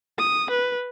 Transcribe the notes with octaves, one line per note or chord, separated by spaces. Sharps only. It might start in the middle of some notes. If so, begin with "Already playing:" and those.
D#6
B4